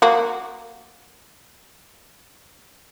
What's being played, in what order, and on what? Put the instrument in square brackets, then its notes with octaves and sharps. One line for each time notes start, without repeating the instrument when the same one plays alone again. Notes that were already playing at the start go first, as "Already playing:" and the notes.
[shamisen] A#3 F#4